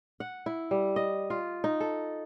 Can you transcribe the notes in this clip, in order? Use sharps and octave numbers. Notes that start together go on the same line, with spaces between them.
F#5
E4
G3
D#5
F4
D#4
A4